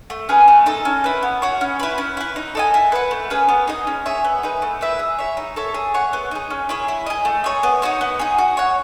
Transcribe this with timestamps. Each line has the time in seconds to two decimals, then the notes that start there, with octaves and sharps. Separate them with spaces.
0.10 A3
0.29 C#4 G#4 B4
0.48 A3
0.66 D#4 A4
0.85 C#4
1.04 E4 B4
1.23 B3
1.42 F#4 C#5
1.61 C#4
1.79 E4 B4
1.98 C#4
2.17 E4 B4
2.36 D#4
2.55 A4 D#5 G#5
2.74 E4
2.92 B4 F#5
3.11 A3
3.30 C#4 G#4 B4
3.49 B3
3.67 D#4 G#4 D#5
3.87 C#4
4.06 G#4 C#5 E5
4.24 B3
4.43 D#4 G#4 B4
4.62 A3
4.81 E4 B4 E5
4.99 G#4
5.19 C#5 E5
5.37 D#4
5.56 A4 C#5 E5
5.74 G#4
5.94 C#5 F#5
6.13 B3
6.31 D#4 G#4
6.50 C#4
6.69 E4 G#4 C#5
6.88 E4
7.06 G#4 D#5
7.25 A3
7.44 D#4 G#4 C#5
7.63 B3
7.82 D#4 F#4 C#5
8.01 B3
8.19 D#4 G#4
8.38 F#4
8.57 C#5 F#5